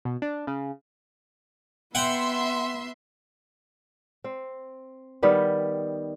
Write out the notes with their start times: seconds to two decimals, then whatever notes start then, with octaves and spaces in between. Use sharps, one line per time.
0.05 B2
0.22 D4
0.47 C#3
1.95 B3 E5 F#5 G5 C6
4.24 C4
5.23 D#3 G3 B3 G4